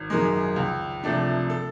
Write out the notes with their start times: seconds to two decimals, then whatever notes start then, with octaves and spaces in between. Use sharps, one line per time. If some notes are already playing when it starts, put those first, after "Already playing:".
Already playing: G#1
0.10 F#2 D#3 G#3
0.56 C#2
1.03 C3 F3 A3 D4
1.50 A4